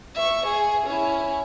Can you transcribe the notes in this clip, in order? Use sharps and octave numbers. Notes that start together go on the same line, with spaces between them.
E5 C#6
G#4
C#4 E4